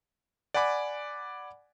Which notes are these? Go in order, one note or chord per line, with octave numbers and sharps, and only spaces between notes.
D5 F#5 G#5 B5 D6